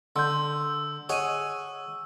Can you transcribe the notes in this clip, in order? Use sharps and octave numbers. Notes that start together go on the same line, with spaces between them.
D3 C6 E6 G6
G#4 C#5 D#5 F#5 D#7